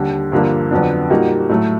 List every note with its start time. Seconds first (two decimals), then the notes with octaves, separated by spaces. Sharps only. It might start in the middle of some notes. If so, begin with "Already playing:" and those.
Already playing: D#2 D3 G3
0.32 G2 D3 F3 A#3 D4
0.71 F2 D3 F#3 B3 D4
1.10 A#2 G3 A#3 D#4 F#4
1.49 A2 F#3 A3